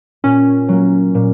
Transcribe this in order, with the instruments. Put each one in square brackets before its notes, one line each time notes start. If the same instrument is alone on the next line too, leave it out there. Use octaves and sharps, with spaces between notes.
[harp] A#2 [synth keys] C#4
[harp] F#3 A#3
A#2